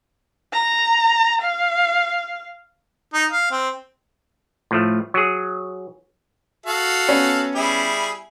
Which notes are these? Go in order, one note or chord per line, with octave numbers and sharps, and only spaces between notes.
A#5
F5
D#4
F5
C4
A2 F3 A3
F#3 G#4
F#4 A4 F5
B3 C#4
G3 E4 G#4